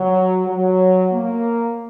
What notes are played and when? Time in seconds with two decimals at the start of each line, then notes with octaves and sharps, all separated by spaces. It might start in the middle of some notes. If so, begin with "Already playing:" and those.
Already playing: F#3
0.47 F#3
1.12 A#3